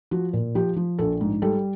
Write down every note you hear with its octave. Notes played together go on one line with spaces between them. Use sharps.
F3 F#4
A#2
F3 G4
F3
A#1 A4
G#2
G3 A4